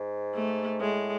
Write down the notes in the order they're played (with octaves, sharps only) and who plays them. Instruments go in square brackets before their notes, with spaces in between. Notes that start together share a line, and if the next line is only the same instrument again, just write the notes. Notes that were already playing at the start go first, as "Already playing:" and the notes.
Already playing: [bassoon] G#2
[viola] A3
[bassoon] A2 [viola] G#3